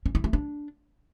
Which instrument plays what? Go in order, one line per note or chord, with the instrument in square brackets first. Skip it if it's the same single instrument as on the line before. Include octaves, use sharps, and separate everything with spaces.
[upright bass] C#4
E4
A3
D4